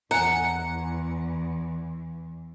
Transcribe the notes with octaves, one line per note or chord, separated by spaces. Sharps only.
E2 F#5 G#5 A#5